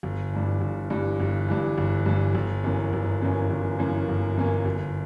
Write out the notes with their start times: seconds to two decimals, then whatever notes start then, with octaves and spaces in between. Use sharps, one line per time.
0.03 G1
0.33 G2 E3
0.61 G1
0.90 G2 E3
1.20 G1
1.48 G2 E3
1.78 G1
2.06 G2 E3
2.35 G1
2.64 F#2 E3 A#3 C#4
2.93 G1
3.22 F#2 E3 A#3 C#4
3.50 G1
3.79 F#2 E3 A#3 C#4
4.08 G1
4.37 F#2 E3 A#3 C#4
4.65 G1